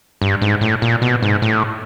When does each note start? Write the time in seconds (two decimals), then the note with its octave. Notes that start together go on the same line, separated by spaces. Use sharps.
0.22 G2
0.42 G#2
0.61 A2
0.82 A#2
1.02 B2
1.22 G#2
1.42 A2